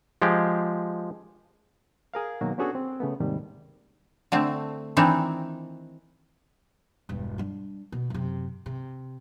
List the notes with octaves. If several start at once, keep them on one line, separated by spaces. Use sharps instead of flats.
F3 G#3 G4
G#4 A#4 F5
B2 D#3 F#3 A#3 F#4
B3 C#4 D4 F#4 G#4 A4
C4
C#3 A3 B3
D#2 G#2 C3 D#3 G3
D3 A3 C4
D#3 E3 C4 D4 D#4
E1 G2
G3 D4
B2
F#2 C3
C3